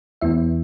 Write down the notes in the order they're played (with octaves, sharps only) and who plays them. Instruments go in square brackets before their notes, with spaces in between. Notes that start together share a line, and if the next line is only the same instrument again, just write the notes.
[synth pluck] E2 E3 B3 E4 E5